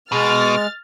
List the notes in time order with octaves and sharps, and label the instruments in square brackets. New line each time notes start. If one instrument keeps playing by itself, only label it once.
[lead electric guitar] B2 [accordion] G#3 [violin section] F6 A6